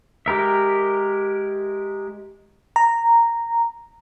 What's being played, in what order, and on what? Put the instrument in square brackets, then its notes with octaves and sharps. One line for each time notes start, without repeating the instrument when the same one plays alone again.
[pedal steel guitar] G#3 G4 A#4 E5
[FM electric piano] A#5